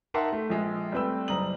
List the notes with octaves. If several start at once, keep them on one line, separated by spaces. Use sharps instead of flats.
D#4 A#4 E5 F#5 A5 C6
A3
A#1 G#3
G3 A3 C4 B4 G5 E6
F#1 G3 A#5 D#6 F#7